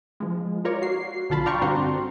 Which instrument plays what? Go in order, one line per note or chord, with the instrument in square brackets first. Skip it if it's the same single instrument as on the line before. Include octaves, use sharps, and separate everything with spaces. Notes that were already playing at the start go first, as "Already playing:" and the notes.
[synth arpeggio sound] F3 G#3
F4 A#4 C#5 D5
F#4 C7
B1 D3 F4 A5 B5
D5 F5 G5 A#5 C6 C#6
G2 D3 C4 F#4 A#5 C6